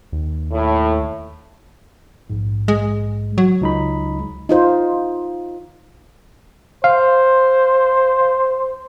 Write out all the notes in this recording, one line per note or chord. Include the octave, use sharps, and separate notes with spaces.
D#2
A2
A#1 G#2
G#3
F#3
C#2 D#4 B5
D#4 F4 C5
C5 F5